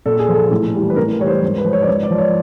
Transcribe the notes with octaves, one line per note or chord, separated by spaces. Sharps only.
A#2 A4
G#4
F3
A4
A2
E3 G3
B4
A2 A#4
E3 G3 C#5
C5
G#2
B4
F3 C5
C#5
D5
G#2 C#5
D5
F3
C#5